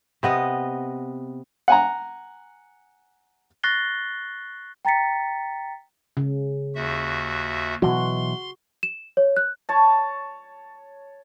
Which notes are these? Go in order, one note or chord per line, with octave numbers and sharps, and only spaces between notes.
C3 B3 D#5
F#5 G#5 A#5
C#6 F#6 A6 A#6 C7 G7
G5 A#5 A6 B6 C#7
C#3
D#2 F#4 E5
B2 E3 F#3 F#4 C6
E7
C#5
F#6
C#5 A5